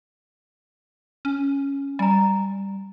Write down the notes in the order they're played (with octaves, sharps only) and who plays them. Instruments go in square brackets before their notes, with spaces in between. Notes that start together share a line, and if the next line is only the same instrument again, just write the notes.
[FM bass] C#4
[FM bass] G3 [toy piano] G#5 A#5